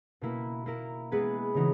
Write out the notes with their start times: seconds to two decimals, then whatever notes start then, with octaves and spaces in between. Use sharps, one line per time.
0.21 B2 A#3 E4 B4
0.66 A#3 E4 A#4
1.12 G#3 B3 E4 G#4 B4
1.54 C#3 E3 D#4 F#4